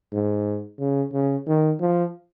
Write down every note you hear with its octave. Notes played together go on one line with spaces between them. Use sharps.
G#2
C#3
C#3
D#3
F3